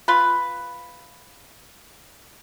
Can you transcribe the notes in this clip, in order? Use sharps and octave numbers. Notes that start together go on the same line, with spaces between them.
F4 B4